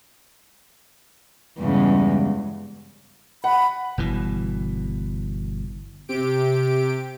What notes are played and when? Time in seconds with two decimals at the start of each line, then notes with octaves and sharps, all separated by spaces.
1.58 E2 G2 C#3 G#3
3.44 F#5 B5
3.98 G1 B2 E3
6.09 C3 G4 D7